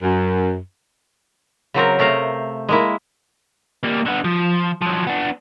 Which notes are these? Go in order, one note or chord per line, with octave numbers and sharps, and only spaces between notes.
F#2
C#3 F#3 C4 A#4
C3 A3 A#4 F5 A#5
G#3 A#3 E4
G3 A#3
D3 B3
F3
F3 F#3
B3 D4